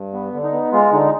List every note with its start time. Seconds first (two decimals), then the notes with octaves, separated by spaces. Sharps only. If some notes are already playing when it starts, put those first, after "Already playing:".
Already playing: G2
0.13 B3
0.33 D3
0.43 D#4
0.53 B3
0.73 G#3 F4
0.92 D3 D#4